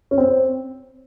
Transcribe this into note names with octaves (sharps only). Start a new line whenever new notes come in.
C#4
C4